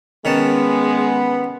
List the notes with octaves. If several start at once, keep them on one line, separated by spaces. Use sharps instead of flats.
D#3 G#3 B3 C#4 A5